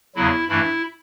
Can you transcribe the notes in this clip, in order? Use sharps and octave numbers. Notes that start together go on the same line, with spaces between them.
E2 C#3 F#3 E4
G2 E3 A3 E4